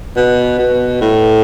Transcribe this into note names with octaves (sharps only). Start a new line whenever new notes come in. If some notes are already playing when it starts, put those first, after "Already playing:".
B2
B2
A2